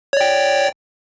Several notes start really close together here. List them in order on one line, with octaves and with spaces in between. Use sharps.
C#5 D5 G5